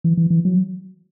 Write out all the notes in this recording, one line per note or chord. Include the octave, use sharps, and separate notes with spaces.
E3
E3
E3
F#3